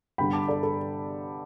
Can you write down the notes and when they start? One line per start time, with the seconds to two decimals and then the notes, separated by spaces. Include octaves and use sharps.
0.18 G1 G2 D3 G5 B5
0.33 A5 D6
0.48 A4 D5
0.63 A4